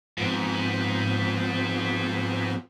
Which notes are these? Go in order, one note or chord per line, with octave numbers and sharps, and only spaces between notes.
G#2 F3 B3 C4